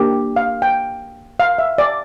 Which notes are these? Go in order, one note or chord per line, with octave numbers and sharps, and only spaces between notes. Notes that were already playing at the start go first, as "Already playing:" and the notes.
Already playing: A#3 D4 G4
F5
G5
F5
E5
D5